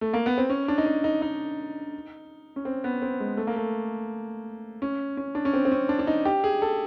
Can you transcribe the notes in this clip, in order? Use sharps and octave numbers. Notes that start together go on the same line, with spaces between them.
A3
A#3
B3
C4
C#4
D4
D#4
D4
D#4
D#4
C#4
C4
B3
C4
G#3
A3
A#3
A3
C#4
C#4
D4
C#4
C4
C4
C#4
D4
D4
D#4
G4
G#4
A4